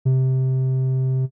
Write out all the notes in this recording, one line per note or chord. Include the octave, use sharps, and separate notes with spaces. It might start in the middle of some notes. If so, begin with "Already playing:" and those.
C3